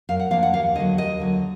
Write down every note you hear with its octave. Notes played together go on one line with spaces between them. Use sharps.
F#2 F5
F#5
F3 A#3 D4 F5
F#5
D#2 F5
D3 F#3 D#5
D#2 D#5
D3 F#3